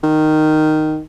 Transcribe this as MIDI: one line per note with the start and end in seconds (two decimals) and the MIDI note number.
0.03 1.01 51